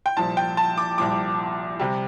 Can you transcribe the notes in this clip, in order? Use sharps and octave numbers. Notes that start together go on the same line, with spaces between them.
G5
C2 A#2 F3 A5
G5
A5
D6
C2 A#2 F3 D6
C3 G3